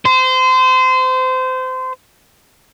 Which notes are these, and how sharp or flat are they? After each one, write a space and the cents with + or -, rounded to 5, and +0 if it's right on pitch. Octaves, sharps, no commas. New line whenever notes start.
C5 -25